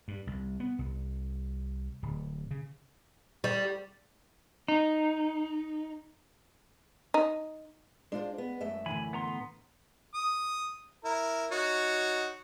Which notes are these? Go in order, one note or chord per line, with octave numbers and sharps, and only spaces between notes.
G2
C2
B3
C2
D1
C#3
G3
D#4
D#4
G#3 D4 F4 C5
B3
F#2 A3 E5
A2 D3 E3 G#5 B5
B3 A#5 C6
D#6
E4 A#4
D#4 F#4 C#5